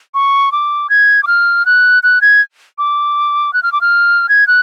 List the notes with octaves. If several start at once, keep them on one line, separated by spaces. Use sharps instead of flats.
C#6
D6
G#6
D6
F6
F#6
F#6
G#6
D6
F#6
F6
D6
F6
G#6
F#6